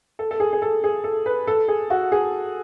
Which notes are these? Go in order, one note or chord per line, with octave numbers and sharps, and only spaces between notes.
A4
A4
G#4
G#4
A4
G#4
A4
B4
A4
G#4
F#4
G#4